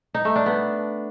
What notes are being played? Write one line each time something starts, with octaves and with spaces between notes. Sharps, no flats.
D#4
A3
D4
B3